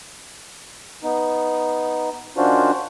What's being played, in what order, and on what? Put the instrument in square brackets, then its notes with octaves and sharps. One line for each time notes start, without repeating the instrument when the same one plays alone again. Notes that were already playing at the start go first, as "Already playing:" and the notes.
[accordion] B3 D#4
D#3 C#4 D4 F4 F#4 C5